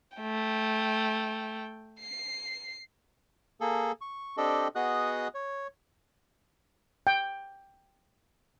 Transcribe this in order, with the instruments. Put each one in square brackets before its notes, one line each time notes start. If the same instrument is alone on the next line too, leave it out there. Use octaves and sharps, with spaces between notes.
[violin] A3 G5
C7
[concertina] A#3 G#4 A4
C#6
C4 D4 G4 A4 D#5
B3 F#4 G#4 D#5 D#6 F#6
C#5
[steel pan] G5